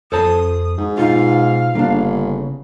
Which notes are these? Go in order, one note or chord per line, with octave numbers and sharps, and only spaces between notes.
F2 A4 C5 A5 D#6
G#2
B2 D#4 F4 F5
G1 C#3 A#3 D4